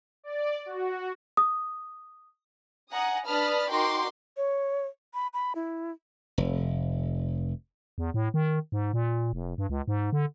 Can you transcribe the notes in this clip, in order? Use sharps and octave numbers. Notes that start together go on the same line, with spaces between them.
D5
F#4
D#6
F#5 G#5 A#5 D#6
D4 B4 A5 B5 D#6 F6
D#4 F#4 A#4 G5 C6 D6
C#5
B5
B5
E4
F1
E2
A2
D#3
G#2
A#2
F1
G2
C#2
G#2
D3